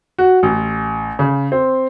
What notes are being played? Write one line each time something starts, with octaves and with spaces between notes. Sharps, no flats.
F#4
A1
C#3
C4